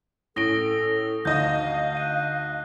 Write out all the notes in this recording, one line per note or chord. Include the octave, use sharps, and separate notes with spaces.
A2 C#4 A4 D#6 A#6 D7 G7
D2 D#4 D#5 F5 G6
F#6 D#7